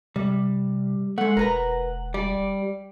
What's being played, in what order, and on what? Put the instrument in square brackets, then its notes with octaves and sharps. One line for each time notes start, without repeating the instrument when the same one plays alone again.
[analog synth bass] C3 [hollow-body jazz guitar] G3
[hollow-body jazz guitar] G#3 A3 [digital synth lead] F#5
[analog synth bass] E1 [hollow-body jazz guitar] A#4 B4 A#5
[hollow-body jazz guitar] G3 [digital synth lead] D5